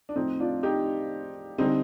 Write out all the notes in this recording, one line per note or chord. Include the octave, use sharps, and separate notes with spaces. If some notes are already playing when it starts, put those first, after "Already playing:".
D4
A2 F3 A3 C4 D#4
D4 F4
D#4 G4
D3 G3 C4 D#4